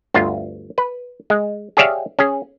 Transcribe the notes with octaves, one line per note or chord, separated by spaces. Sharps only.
G1 D2 F4
B4
G#3
G4 G#4 C#5 D5 E5 F5
C#4 G#4